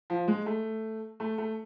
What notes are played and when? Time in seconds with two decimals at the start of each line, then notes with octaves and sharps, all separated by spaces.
0.10 F3
0.28 G#3
0.46 A3
1.20 A3
1.38 A3